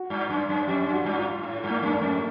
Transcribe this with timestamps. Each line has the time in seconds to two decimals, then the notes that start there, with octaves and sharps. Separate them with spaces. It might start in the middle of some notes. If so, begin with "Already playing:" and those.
Already playing: F#4
0.10 G2
0.30 F#2
0.49 F#2
0.68 F2 G4
0.86 F#2
0.93 F#4
1.05 G2
1.19 F4
1.43 A2
1.64 G2
1.70 A#3
1.83 F#2 A#3
1.95 A3
2.02 F2